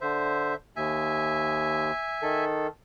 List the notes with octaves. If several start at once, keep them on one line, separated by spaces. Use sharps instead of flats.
D3 C5 E5
D#2 E5 G#5
D#3 A4